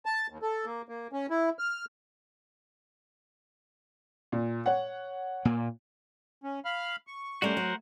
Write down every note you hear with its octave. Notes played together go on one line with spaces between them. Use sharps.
A5
D#2
A4
A#3
A#3
C#4
E4
F6
A#2
C#5 F#5
A#2 A#3
C#4
F5 B5 F6
C#6
G3 A3 C#4 F#4 A#4 C5
F#3